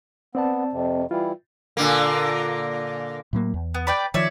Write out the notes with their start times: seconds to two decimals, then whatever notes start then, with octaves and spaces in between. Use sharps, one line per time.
0.35 B3 C4 D5 A5
0.73 F2 C3
1.11 E3 G3 E4 F4
1.77 A#2 D3 A#3
3.33 A2 F#3 A#3
3.54 E2
3.74 B3
3.87 B4 D5 G5
4.14 D#3 F3 C#5 D5 E5